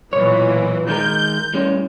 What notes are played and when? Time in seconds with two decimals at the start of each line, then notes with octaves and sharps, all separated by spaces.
0.13 B1 A#2 E3 C#5
0.89 D#3 G#3 A#4 G6
1.54 A2 G3 C#4